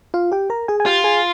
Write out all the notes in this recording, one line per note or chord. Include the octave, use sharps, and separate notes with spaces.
F4 F5
G4 G5
A#4 A#5
G#4 G#5
G#5
F4 G4 G5
G#4 G#5